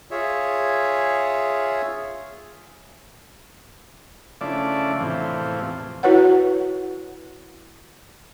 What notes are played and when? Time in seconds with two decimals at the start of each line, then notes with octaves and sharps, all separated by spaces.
0.11 F4 G#4 C#5 E5
4.41 C#3 F3 A3 D4 E4 D5
5.00 E2 A2 C3 F3
6.03 E4 F#4 B4 C#5 F#5